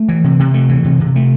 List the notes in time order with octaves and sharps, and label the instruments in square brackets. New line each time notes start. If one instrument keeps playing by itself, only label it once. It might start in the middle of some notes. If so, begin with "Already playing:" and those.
Already playing: [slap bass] A3
E3
C3
C3
A3
E3
C3
C3
A3